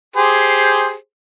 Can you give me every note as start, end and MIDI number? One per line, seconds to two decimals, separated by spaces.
0.16 0.95 67
0.16 0.95 68
0.16 0.95 72